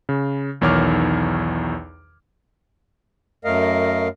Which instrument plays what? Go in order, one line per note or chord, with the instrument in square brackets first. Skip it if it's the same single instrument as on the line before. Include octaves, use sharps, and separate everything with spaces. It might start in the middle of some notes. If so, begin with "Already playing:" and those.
[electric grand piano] C#3
B1 E2 D#3 C#5 D6 F6
[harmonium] F#2 A3 A#4 D#5 F5